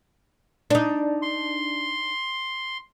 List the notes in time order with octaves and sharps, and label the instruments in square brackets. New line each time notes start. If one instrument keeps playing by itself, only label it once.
[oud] D4 D#4
[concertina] C6